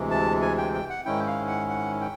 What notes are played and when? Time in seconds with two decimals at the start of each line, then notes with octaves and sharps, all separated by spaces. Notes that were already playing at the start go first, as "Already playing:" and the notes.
Already playing: D2 C3 E3 G#3
0.11 A5
0.42 G#5
0.58 G5
0.74 G5
0.90 F#5
1.05 G#2 D#3 G#3 C#4 E4 G5
1.27 F5
1.48 F#5
1.69 F#5
2.01 G5